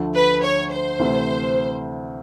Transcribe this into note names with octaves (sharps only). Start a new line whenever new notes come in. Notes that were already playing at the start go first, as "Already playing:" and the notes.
Already playing: D2 D3 F3 A3
B4
C#5
C5
D2 C3 E3 A3 C4